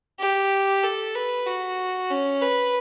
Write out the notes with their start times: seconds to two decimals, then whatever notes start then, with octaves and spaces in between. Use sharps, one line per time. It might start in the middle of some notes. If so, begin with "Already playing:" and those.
0.20 G4
0.83 A4
1.15 B4
1.46 F#4
2.10 C#4
2.42 B4